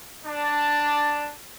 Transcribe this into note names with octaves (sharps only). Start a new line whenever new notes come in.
D4 A5